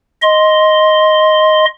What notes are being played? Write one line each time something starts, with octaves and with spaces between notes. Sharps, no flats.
D#5 C6